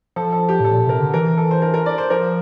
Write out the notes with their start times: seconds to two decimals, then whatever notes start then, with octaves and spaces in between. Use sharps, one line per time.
0.16 F3 A4
0.32 A4
0.49 G4
0.60 A2 A4
0.73 A#2
0.87 C3 A#4
1.00 D3
1.14 E3 A#4
1.37 A4
1.51 C5
1.62 A#4
1.74 A#4
1.86 D5
1.98 C5
2.10 F3 A#4